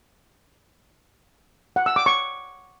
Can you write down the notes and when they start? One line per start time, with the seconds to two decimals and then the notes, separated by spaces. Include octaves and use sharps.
1.76 F#5
1.86 E6
1.96 D6
2.06 C#6